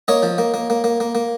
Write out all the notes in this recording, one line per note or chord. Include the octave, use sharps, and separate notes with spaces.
A#3 C#5 D#5
F3
A#3
A#3
A#3
A#3
A#3
A#3